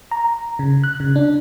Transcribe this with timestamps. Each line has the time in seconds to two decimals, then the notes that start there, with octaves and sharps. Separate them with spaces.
0.11 A#5
0.59 C#3
0.84 F#6
1.00 C#3
1.16 D4